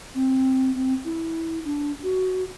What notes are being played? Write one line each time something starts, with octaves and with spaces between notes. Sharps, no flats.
C4
C4
E4
D4
F#4